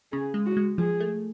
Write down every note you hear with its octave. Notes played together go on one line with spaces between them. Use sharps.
C#3 G#4
G#3
F#4
G#3
F3 G#4
A3